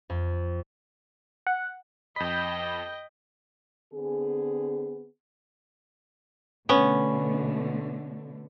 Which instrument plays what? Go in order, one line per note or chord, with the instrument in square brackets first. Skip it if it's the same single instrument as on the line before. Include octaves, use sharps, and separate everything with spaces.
[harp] F2
[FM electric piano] F#5
[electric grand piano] F2 B6 [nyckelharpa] D#5 G5 [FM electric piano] B5 G6
[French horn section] D3 B3 C4 G#4
[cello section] B2 D3 A3 [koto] B3 C#4